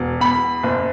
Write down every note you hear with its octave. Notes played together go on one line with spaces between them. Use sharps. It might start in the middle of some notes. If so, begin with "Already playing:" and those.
Already playing: E1
E2 B5
F#1